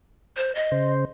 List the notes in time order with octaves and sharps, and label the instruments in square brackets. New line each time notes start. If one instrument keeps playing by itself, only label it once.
[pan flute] C5
D#5
[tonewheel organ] C#3 C5